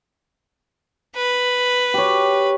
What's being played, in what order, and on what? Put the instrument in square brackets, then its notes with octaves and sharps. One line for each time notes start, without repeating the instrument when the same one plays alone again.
[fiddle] B4
[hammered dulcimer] G4 C#5